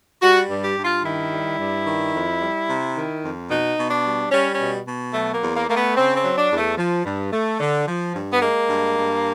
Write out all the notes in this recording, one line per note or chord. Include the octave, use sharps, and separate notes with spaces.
G3 F#4
G2
G4
G2
F4
D#3 E4
G3
G2
D#3
F2
G3
C3
D#3
F2
B2 D#4
B2
D4
G3
G3 C#4
C#4
B2
B2
F#3 A3
A#3
E2
A#3
A3 A#3
B3
C#3 C4
C4
F#3
D4
E2
A3
F3
G2
A3
D3
F3
G2
B3
G#3 A#3
G2
G2